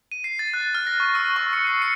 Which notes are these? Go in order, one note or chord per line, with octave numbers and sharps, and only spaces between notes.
D#7
C7
A6
F#6
F6
A#6
C#6
E6
C#6
C#7
C7
C#7